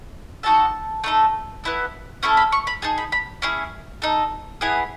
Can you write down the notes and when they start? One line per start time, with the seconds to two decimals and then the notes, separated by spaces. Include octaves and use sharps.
0.43 D#4 F#4 A4 A5
1.04 A3 D#4 A4
1.64 B3 E4 A4
2.23 C#4 E4 A4 C#6
2.37 B5
2.52 C#6
2.67 B5
2.82 D#4 G#4 A5
2.98 B5
3.12 B5
3.42 C#4 E4 G#4
4.02 D#4 A4
4.61 B3 E4 G#4 G#5